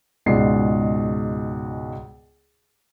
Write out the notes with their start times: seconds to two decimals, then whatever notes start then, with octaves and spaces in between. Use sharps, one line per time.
0.26 C#2 G#2 B2 F4 D5 C7